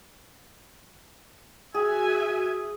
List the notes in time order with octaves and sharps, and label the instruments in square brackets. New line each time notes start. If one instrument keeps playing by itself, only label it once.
[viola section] F#4 E5 G#5 [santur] G#4